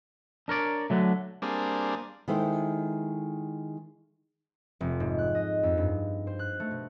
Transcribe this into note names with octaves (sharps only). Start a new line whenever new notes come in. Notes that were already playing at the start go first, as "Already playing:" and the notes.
D4 A#4 C#5 D5
D3 F#3 A3
G3 A#3 C4 D4 G#4
D#3 G#3 E4 A4 C5
F1
G#2
F#6
D#5
F2
G2
C5
F#6
A3
B2